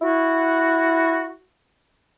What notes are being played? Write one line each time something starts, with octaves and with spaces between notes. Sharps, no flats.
E4 F#4